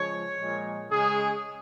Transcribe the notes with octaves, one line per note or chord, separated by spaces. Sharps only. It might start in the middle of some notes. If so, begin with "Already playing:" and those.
Already playing: C#3 F3 G#3 C#5
A#2 F3 G#3
C#3 G#3 G#4